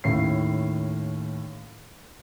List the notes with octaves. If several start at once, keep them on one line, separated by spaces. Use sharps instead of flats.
D#2 A2 C#4 C7